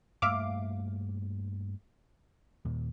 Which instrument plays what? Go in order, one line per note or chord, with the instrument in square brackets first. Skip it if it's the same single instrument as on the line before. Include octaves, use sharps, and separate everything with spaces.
[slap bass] G2 A3 A#3 [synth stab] E5 F5 D6
[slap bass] D#2 A#2